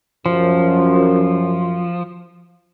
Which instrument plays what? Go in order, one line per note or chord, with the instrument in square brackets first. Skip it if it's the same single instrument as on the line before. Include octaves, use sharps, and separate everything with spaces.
[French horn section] F#2 [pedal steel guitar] F3